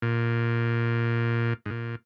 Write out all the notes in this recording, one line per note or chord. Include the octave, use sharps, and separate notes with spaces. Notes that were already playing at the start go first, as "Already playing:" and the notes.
A#2
G#2
A#2